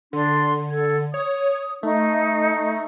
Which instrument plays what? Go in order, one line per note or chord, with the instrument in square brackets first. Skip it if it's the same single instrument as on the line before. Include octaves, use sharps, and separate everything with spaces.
[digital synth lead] D3 [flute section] D4 C6
[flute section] A4 G#6
[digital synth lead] C#5 [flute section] D#6
[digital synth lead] A3 [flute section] D#4